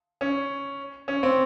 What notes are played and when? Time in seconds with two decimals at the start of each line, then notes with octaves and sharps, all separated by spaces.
0.21 C#4
1.08 C#4
1.23 C4